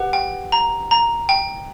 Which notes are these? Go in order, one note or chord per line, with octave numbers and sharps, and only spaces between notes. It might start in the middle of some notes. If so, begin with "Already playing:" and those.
Already playing: G4 B4 F#5
G5
A#5
A#5
G5